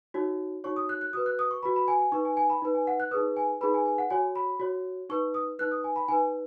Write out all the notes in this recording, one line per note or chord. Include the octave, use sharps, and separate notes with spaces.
D#4 F#4 C#5
D#4 F#4 C#5 C#6
D#6
F#6
F#6
F#4 B4 D#6
F#6
D#6
C#6
F#4 B4 B5
B5
G#5
G#5
D#4 B4 C#6
G#5
G#5
B5
D#4 B4
G#5
F#5
F#6
D#4 G#4 B4 D#6
G#5
D#4 G#4 B4 B5
G#5
G#5
F#5
F#4 C#5 G#5
B5
F#4 C#5
D#4 B4 C#6
D#6
D#4 B4 F#6
D#6
G#5
B5
D#4 B4 G#5